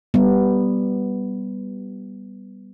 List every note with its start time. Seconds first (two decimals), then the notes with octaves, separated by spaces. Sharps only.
0.14 G3 B3